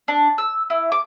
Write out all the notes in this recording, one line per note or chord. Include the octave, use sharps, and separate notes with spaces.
D4
E6
E4
D6